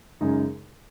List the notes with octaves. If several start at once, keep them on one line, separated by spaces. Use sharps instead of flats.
F#2 C#3 G#3 D#4 G#4